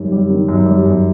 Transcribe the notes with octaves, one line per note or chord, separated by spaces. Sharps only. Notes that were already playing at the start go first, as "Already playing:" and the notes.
Already playing: F#2 D#3 G3
G3
D#3
F#2
G3
F#2